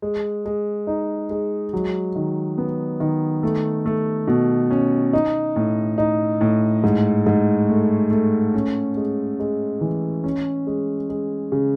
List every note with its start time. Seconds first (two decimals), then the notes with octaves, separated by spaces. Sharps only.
0.02 G#3
0.45 G#3
0.87 D#4
1.30 G#3
1.73 F#3
2.16 D#3
2.58 B3
3.00 D#3
3.43 A3
3.86 A3
4.28 B2
4.71 C#4
5.13 D#4
5.56 A2
5.98 D#4
6.41 A2
6.83 G#2
7.26 G#2
7.69 A3
8.11 A3
8.54 C#4
8.97 G#3
9.40 G#3
9.81 E3
10.24 C#4
10.67 G#3
11.09 G#3
11.52 C#3